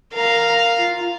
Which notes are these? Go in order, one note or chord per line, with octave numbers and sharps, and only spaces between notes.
A#4 F5 A#5
F4